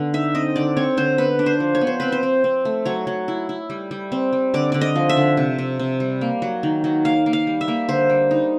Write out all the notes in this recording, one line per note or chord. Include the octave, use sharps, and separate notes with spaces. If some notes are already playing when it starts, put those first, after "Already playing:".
Already playing: D3 B3
D#4 E5
C4 D#5
D3 D5
C4 C#5
D3 C5
B3 B4
D4
C5
F3
C#5
B3
C5
C4 B4
C5
C4
C4
A3
F#3 C#5
F#3
E4
E4
G3
G3
C4
G3
D3 D5
D3 D5
D#5
F3
E5
D3
C3
C3
C3
G3
A#3
F#3
D#3
F#3
A#3 F5
A#3
F5
G3
E5
A#3
D3 C5
G3
D#4